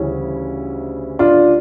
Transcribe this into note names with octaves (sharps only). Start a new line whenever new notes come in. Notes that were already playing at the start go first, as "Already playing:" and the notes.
Already playing: D2 C#3 E3 G3 C#4 E4
D4 F4